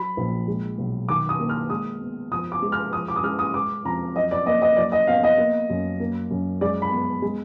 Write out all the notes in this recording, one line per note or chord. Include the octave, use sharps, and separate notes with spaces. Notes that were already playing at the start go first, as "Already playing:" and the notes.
Already playing: F#3 B5
A#1
G#3
B1
D#3 D6
D#6
A#3
F6
G#3 D#6
B3
F3 D#6
D6
G#3
F6
F3 D#6
D6
D#6
G#3 F6
D#6
G#3 D6
F2 A#5
F#3 D#5
D5
A#3 D#5
D#5
F#3 D5
D#5
B3 F5
D#5
A#3
F#2
A#3
F#2
G#3 D5
B5
B3
G#3